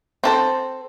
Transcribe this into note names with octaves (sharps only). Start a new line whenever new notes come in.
C4 A4 C5